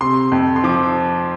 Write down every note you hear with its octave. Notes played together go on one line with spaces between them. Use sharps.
C3 C6
F2
C6
F3 D6